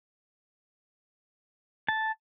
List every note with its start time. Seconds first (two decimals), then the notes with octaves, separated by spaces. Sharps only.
1.89 A5